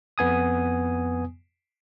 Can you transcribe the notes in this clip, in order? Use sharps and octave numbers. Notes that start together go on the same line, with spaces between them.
F2 B3 G#5 D#6